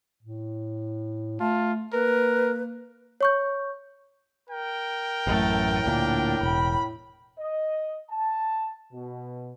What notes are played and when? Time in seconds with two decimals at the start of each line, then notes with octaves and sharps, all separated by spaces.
0.23 A2
1.40 A3 F4 A5
1.93 A#3 A#4 B4
3.21 C#5 C#6 G6
4.49 A#4 G5
5.27 A1 F#2 A2 A3
5.86 D2 A#2 D4
6.41 E1 B5
7.39 D#5
8.11 A5
8.92 B2